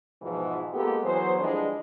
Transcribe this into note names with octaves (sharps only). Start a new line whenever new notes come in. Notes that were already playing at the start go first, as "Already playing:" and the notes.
E2 G#2 B2 E3 F3
G#3 A#3 B3 F4 G4 A4
E3 F#3 B3 G#4 C5
D3 E3 F3 G3 G#3 D4